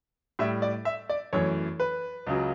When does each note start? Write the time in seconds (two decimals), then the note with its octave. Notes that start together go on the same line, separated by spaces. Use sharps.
0.39 A2 G3 E5
0.62 D5
0.85 E5
1.09 D5
1.33 F#2 E3 A3 C#5
1.80 B4
2.27 C#2 C#3 F#3